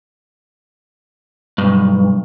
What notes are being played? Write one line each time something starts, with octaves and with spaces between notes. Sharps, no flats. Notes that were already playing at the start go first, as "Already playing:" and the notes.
B1 G2